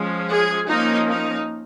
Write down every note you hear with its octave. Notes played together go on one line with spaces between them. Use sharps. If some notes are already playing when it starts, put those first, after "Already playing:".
Already playing: F3 G#3 C#4
G#4
F3 A#3 C#4 D#4
D#4